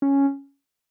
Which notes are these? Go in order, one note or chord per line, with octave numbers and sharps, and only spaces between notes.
C#4